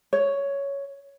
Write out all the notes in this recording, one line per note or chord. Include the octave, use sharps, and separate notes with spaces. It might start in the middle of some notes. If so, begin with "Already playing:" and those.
C#5